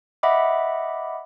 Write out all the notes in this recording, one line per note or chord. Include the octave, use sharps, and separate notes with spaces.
D#5 E5 F#5 B5 D6